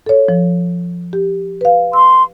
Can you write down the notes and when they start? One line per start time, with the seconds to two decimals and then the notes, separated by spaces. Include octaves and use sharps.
0.06 A4 C#5
0.29 F3
1.13 G4
1.61 B4 F5
1.93 C6 E6